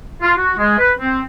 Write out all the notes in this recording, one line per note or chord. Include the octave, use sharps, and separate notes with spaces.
F4
F#4
G#3
B4
C4